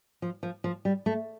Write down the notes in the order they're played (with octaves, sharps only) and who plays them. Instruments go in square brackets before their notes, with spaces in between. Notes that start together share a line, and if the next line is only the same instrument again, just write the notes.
[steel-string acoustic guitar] F3
F3
F3
G3
A3